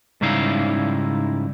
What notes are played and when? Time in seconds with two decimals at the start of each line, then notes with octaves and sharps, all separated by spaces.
0.21 G#2 C#3 G3 D#4 E4 F5